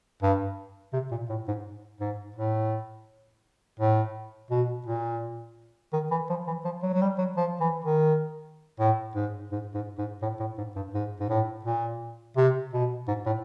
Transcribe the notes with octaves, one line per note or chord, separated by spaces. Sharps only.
G2
C3
A#2
A2
G#2
G#2
A2
A2
B2
A#2
D#3
E3
F3
E3
F3
F#3
F#3
G3
F#3
F3
E3
D#3
A2
G#2
G#2
G#2
G#2
A2
A2
G#2
G2
G#2
G#2
A2
A#2
C3
B2
G#2
A2